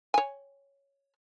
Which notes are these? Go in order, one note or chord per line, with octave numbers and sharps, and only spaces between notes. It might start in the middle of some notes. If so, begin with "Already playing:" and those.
C#5 G#5